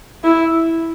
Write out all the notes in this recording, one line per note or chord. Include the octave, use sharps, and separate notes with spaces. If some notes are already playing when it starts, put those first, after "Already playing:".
E4